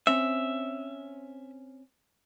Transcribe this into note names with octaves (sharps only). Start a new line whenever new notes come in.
C4 C#4 E5